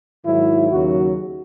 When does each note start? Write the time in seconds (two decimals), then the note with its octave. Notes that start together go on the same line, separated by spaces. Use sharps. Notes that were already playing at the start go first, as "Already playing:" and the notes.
0.24 G#2 D#3 F#3 E4
0.71 D#2 C#3 F#3 F#4